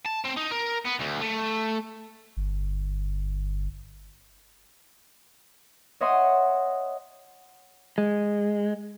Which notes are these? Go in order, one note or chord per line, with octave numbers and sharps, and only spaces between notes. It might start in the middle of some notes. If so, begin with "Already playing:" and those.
A5
C4
D#4
A#4
B3
D2
A3
G1
C#5 D#5 E5 F#5 C6 D#6
G#3